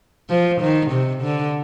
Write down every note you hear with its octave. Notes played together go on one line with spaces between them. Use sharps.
F3
D#3
C3
D3